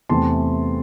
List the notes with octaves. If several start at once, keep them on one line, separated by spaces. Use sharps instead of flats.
E2 C3 E3 A3 C4 A5 C6